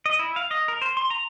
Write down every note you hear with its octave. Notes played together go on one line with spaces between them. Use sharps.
D#5
E4
F5
D#5
A#4
C5
C6
A#5